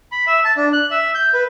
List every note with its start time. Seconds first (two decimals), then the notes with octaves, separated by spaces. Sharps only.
0.12 B5
0.27 E5
0.44 A5
0.57 D4
0.73 F#6
0.91 E5
1.15 G6
1.34 B4